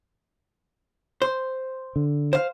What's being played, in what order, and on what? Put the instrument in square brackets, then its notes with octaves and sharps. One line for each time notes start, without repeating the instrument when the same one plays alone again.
[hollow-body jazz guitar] C5
[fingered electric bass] D3
[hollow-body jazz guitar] C5 F5